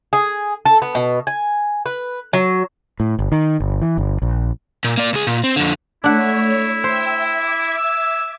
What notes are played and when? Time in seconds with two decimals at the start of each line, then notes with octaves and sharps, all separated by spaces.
0.13 G#4
0.65 A4
0.82 B3
0.95 B2
1.27 G#5
1.86 B4
2.33 F#3
3.00 A2
3.19 G1
3.32 D#3
3.60 G1
3.82 E3
3.98 G1
4.22 A#1
4.84 A#2
4.97 A#3 D5
5.13 C#2 G#4
5.27 A#2
5.44 C4
5.56 F2 D3
6.04 A3 D4 E4 C#5 F#5
6.84 C5 E5 G5 E6
7.33 E5 D6 G#6
7.77 E6